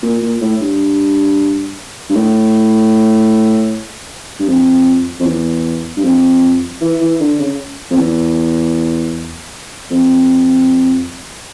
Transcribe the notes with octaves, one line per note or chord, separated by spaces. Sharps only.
A#2
A#2
A2
G2
G2
A2
G2
F2
F2
E2
G2
F2
E3
E3
D3
C#3
F2
E2
F2